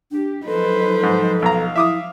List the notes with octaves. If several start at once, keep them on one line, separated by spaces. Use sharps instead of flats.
D4 G4
F3 F#3 D#4 A4 B4 C5
G#2
B1 F5 A#5
F3 E4 E5 D6 D#6